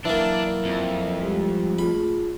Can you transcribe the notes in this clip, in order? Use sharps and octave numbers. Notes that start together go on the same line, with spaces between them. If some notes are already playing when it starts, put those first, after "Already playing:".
E3 F#3 A#3 D4
F2
G3 G#3 G4
A3 F4 G#4 B5